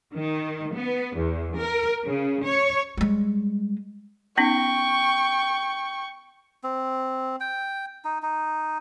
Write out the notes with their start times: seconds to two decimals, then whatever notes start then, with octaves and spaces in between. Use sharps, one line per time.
0.15 D#3
0.76 B3
1.17 E2
1.58 A#4
2.06 C#3
2.45 C#5
2.97 G3 G#3
4.37 B3 C#4 D#4 G5 C#6
6.64 C4
7.40 G5
8.04 D#4
8.22 D#4